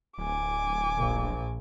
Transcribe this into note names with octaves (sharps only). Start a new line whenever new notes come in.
D1 G#5 D6
A#1 A#2